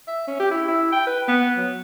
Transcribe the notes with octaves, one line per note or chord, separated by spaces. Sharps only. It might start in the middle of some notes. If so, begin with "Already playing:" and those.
E5
C#4
G4
E4
E4
G5
B4
B3
F#3